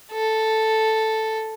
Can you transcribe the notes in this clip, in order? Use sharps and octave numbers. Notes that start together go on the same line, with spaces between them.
A4